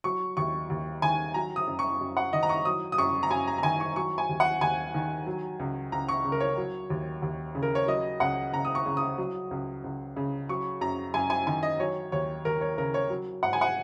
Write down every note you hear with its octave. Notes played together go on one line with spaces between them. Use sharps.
F#3 C#6
D#2 C#6
D#2
D#3 G#5
F#3 A#5
D#6
F#2
C#6
F#2
F#5
D#3 D#5
A#5
C#6
F#3 D#6
D#6
F#2 C#6
A#5
F#2 G#5
A#5
A#5
D#3 G#5
C#6
F#3 C#6
G#5
D#2
F#5
D#2 G#5
D#3
F#3
C#2
C#2 A#5
C#6
C#3
A#4
C#5
F#3
D#2
D#2
C#3
A#4
C#5
F#3 D#5
C#2 F#5
C#2 A#5
D#6
C#6
C#3
D#6
F#3
C#2
C#2
C#3
F#3 C#6
F#2 A#5
F#2 G#5
G#5
D#3 G#5
D#5
F#3 C#5
D#2 C#5
D#2 A#4
C#5
C#3 A#4
C#5
F#3
G#2 F#5
G#5
F#5